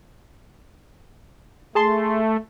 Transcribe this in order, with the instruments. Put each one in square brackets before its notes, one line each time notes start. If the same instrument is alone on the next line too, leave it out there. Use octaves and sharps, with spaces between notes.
[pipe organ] A3 [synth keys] G#4 A5 C6